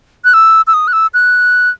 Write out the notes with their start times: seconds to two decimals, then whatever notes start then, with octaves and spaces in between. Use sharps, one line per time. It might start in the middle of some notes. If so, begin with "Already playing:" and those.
0.25 F#6
0.34 E6
0.67 E6
0.74 D#6
0.88 F#6
0.93 E6
1.14 F#6